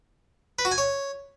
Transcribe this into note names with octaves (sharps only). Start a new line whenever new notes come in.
B4
F#4
G#5
C#5